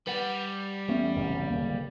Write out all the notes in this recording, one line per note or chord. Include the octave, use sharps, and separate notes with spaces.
G3 B4 F#5
E2 A3 B3 C#4
F#1 C2 A2
D1 C#3 A#3